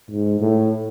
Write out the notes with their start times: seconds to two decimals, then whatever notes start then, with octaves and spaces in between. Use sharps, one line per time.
0.11 G#2
0.41 A2